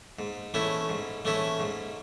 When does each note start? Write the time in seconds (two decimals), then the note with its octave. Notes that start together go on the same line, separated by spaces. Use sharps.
0.19 G#2
0.54 E3 A3 C#4 E4
0.89 G#2
1.25 E3 A3 C#4 E4
1.60 G#2